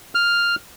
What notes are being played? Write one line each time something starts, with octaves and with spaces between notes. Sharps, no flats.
F6